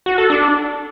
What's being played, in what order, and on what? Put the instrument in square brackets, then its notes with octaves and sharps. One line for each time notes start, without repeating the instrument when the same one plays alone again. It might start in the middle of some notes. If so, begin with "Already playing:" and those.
[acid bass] F#4
A4
D4